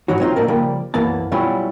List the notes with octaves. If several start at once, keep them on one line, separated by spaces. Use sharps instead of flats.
G#2 E3 F#3 D#4 F#4
F#3 C4 D#4 F4 G5
A#2 D3 A3 D4 D#4 A#4
C#3 F3 G3 A#3
C2 F#2 E3 A#3 B3 A5
B2 F#3 G3 C#4 E4 F4